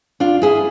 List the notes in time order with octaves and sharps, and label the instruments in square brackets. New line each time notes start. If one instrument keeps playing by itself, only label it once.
[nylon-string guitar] D4 F4
E4 G#4